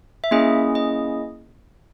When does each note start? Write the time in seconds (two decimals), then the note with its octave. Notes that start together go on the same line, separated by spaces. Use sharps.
0.24 E5
0.31 A#3 C#4 E4 G#4 D#5
0.75 D#5